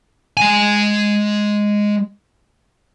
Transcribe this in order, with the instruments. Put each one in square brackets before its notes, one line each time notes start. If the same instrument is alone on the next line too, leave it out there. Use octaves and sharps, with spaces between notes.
[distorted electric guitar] G#3 G#5